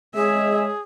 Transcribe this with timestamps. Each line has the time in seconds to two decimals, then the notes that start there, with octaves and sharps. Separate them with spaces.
0.15 G#3 G#4 C#5 E5